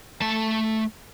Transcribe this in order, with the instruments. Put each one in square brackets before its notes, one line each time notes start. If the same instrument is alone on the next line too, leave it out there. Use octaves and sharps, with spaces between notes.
[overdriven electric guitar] A3 A5